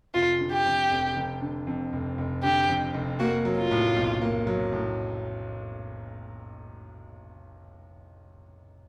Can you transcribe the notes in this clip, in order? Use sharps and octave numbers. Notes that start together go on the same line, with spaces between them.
F1 F4
D3
G4
F2
F1
F1
D3
F2
F1
F1
D3 G4
F2
F1
A#3 F#4
F#3
F4
A2
B1
A#3
F#3
A2